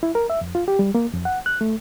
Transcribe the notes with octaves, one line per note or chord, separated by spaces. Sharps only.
E4
A#4
E5
F2
F4
G4
G3
A#3
F2
F#5
F#6
A3